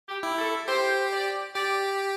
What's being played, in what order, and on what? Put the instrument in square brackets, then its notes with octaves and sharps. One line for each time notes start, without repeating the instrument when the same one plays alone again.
[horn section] G4
[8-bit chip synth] E4
[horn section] A4
[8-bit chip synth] G4 [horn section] C5
[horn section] D5
[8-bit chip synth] G4 [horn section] D5